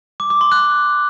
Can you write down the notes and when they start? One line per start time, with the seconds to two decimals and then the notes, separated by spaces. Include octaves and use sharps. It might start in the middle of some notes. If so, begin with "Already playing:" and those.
0.20 D6
0.30 D6
0.41 C6
0.52 F#6